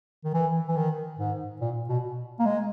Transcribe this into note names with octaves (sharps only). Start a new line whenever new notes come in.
D#3
E3
E3
D#3
G#2
A#2
B2
A#3
G#3